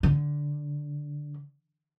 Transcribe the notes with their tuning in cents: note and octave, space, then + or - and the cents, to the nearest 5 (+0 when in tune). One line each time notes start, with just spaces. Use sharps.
D3 -5